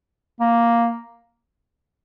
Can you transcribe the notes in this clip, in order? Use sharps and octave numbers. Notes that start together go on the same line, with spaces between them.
A#3